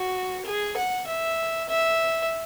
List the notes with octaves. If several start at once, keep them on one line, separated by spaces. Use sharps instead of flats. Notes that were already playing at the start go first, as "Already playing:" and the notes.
Already playing: F#4
G#4
F#5
E5
E5